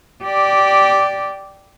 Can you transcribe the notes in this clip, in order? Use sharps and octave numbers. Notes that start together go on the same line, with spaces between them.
G4 D5